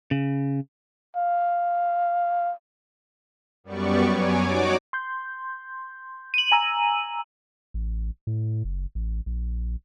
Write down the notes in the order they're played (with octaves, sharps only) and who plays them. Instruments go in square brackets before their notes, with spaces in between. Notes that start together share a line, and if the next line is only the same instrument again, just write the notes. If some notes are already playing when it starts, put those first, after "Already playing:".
[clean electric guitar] C#3
[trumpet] F5
[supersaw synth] F#2 G3 B3 D5 C#6
F#3 C#5 G#5 D6
D#4 F#4 C#5 D5 D6
[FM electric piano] C6 G6
[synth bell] D#7 F#7
[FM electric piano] G#5 A#5 E6
[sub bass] A1
A2
F#1
A1
A#1